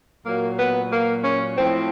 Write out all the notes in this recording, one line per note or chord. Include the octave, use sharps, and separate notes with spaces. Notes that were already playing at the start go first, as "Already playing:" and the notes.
A#2 F#3 A#3
B3
A#3
C#4
A2 F3 C4